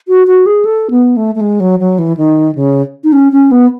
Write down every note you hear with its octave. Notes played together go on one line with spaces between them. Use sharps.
F#4
F#4
G#4
A4
B3
A3
A3
G#3
F#3
F#3
E3
D#3
C#3
D#4
C#4
C#4
B3